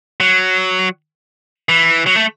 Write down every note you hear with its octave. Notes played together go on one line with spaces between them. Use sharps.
F#3
E3
F#3
A3